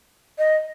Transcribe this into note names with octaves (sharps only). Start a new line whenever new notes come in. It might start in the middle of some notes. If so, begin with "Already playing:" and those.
D#5